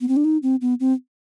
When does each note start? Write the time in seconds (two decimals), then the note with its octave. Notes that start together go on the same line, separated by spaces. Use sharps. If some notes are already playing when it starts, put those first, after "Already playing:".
0.01 B3
0.08 C4
0.16 D4
0.25 D#4
0.43 C4
0.61 B3
0.80 C4